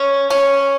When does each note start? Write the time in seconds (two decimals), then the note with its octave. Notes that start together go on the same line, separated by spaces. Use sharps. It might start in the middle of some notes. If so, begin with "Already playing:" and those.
Already playing: C#4
0.30 C#4